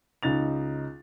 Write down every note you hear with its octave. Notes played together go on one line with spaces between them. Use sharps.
C#2 D#4 A6 F7